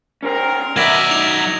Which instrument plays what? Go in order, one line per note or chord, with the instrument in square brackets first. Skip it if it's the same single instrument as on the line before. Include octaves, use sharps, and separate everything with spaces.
[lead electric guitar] C#4 C5 [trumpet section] A#4
[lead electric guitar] B2 B3 [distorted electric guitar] F#3 D5 [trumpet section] A#4 E5 [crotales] G#6 A#6
[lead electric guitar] D#4 [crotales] F7